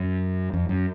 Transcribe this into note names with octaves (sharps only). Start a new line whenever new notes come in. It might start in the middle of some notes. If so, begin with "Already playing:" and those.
Already playing: F#2
F2
F#2